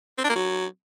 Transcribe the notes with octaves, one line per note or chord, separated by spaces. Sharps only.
C4
D4
A#3
F#3